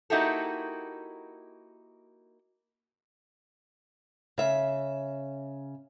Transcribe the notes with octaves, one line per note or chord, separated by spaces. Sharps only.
A#3 D#4 E4 F#4 G4 A4
C#3 E5